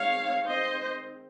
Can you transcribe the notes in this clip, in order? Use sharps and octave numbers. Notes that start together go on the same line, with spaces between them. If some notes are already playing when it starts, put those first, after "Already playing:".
Already playing: D#3 G#3 C4 C#5 F5
C5 D#5